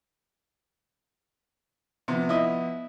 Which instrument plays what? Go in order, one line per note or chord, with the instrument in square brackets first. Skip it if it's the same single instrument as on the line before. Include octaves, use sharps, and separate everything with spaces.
[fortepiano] C3 [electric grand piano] F3 B3
[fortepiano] E4 D#5 E5